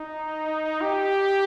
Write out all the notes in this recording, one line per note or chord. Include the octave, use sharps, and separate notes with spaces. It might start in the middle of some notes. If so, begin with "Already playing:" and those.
Already playing: D#4
G4